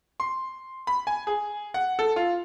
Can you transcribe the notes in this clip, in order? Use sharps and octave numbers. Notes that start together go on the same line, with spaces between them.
C6
B5
G#5
G#4
F#5
A4
F4